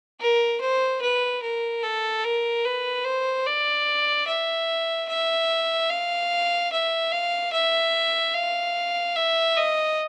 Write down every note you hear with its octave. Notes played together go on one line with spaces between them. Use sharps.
A#4
C5
B4
A#4
A4
A#4
B4
C5
D5
E5
E5
F5
E5
F5
E5
F5
E5
D#5